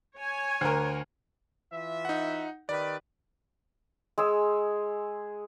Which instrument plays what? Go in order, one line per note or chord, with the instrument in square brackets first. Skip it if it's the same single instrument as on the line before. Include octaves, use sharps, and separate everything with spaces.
[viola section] C#5 G#5
[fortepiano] D2 A#4
[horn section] E3 F4 E5
[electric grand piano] D#4 F#5
[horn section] D#3 G4 B4 [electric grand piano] D5
[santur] G#3 G#4 E6